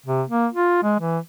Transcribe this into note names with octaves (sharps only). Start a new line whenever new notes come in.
C3
A#3
F4
G#3
E3